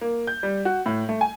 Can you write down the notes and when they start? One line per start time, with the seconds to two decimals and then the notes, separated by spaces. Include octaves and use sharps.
0.01 A#3
0.27 G6
0.43 G3
0.65 F#4
0.86 A2
1.09 A3
1.21 G#5